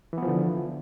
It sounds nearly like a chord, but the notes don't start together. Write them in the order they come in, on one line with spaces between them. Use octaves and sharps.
E3 B3 F3 D3